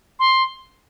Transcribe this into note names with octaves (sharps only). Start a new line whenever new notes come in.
C6